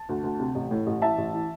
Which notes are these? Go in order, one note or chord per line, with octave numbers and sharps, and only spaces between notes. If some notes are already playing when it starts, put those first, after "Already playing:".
Already playing: A5
D2
D2
C3
A1
A2
A1
E3 E5 A5
A1
E3